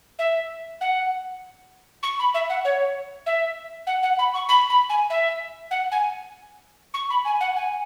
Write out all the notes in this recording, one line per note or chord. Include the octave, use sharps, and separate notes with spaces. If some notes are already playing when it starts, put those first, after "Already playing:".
E5
F#5
C#6
B5
E5
F#5
C#5
E5
F#5
F#5
B5
C#6
B5
B5
G#5
E5
F#5
G#5
C#6
B5
G#5
F#5
G#5